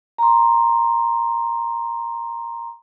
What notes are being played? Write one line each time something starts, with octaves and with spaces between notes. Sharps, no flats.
A#5 C6